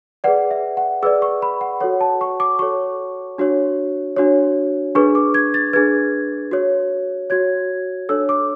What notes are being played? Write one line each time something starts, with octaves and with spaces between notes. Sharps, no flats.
G#4 B4 D5 F#5
E5
F#5
G#4 B4 D5 E6
C#6
B5
F#5
F#4 A4 C#5 F#5
A5
C#6
D6
F#4 A4 C#5 C#6
D4 F#4 C#5
D4 F#4 C#5
D4 G#4 B4 C#6
D6
G#6
A6
D4 G#4 B4 G#6
F#4 C#5
F#4 C#5 G#6
D4 A4 C#5 E6
D6